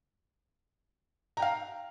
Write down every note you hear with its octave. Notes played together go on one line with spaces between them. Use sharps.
F5 G5 A#5